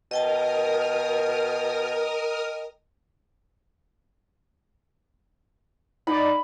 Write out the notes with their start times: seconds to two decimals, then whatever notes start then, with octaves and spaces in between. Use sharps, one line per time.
0.11 B2 A#4 D#5 G5 A5 D#6 F6
6.07 D#4 D5 B5